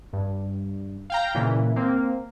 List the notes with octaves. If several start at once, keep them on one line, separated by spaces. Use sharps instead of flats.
G2
F5 G5 A#5
A#2 C#3 E3
A#3 C4